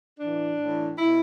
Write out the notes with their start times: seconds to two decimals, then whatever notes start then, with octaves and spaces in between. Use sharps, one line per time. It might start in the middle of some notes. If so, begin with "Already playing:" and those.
0.20 A2 E3 D4
0.59 A2 E3
0.99 B2 E4